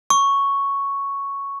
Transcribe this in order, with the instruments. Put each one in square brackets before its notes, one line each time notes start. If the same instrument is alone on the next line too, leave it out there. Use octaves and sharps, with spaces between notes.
[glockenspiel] C#6